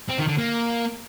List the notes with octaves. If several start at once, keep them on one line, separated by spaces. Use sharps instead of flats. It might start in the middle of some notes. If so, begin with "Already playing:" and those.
C4
D#3
D3
A#3